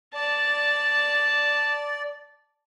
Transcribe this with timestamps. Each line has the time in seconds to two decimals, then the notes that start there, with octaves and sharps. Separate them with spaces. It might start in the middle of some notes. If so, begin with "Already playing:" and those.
0.14 D5 A5